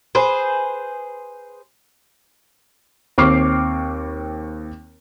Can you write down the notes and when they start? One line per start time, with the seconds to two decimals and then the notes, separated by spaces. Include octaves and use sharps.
0.15 G#4 B4 C5
3.18 D#2 C4 C#6 D6 F6 C7